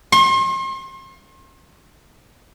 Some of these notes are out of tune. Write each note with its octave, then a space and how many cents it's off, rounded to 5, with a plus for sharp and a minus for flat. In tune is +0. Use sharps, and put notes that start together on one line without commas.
C6 +40